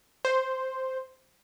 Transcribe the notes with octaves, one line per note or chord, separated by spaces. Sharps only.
C5